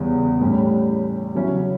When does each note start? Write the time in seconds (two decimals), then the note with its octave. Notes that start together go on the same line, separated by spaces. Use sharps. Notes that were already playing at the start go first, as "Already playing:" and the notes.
Already playing: E2 C#3 G3 B3
0.41 A2 G3 C#4 G4
1.35 C#3 F#3 C#4 E4